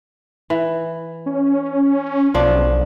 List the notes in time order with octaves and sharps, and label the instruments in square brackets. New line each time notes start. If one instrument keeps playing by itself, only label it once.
[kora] E3
[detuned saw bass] C#4
[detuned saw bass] B1 [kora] F3 D4